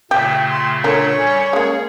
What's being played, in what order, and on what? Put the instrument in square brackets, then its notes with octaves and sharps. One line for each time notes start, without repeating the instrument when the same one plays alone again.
[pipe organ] A#2 C#3 A3 [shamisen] G4 [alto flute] G5
[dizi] C6
[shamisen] D3 A#4 [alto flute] A4 [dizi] C#5
[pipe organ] G3 [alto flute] G#5
[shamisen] G#3 A#3 [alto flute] C#4 [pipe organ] G#4